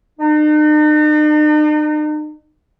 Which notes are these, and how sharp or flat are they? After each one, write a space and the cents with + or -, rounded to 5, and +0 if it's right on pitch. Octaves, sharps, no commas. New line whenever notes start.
D#4 -45